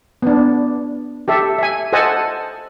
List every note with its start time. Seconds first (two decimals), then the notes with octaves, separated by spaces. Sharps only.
0.22 B3 D4
1.28 G4 A4 E5
1.58 E5 G#5
1.93 A4 C5 D#5 F#5 G#5 A5